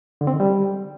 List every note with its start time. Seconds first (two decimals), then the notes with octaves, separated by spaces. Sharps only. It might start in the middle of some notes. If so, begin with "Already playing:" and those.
0.21 D3
0.27 C4
0.34 D#3
0.40 G3